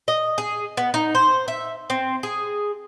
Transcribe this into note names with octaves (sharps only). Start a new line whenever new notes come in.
D#5
G#4
B3
D#4
C5
E5
C4
G#4